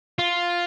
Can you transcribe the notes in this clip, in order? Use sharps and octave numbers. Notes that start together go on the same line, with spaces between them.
F4